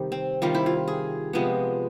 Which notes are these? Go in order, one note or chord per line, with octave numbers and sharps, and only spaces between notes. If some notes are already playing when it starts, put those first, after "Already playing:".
Already playing: C3 D#3 G3
C4
C3 D#3 G3 F4
E4
F4
G#4
C3 F3 G#3 B3